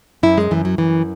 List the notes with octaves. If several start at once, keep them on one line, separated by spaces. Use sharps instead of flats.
F#2 E4
G#3
F#2 E3
F#3
F#2 E3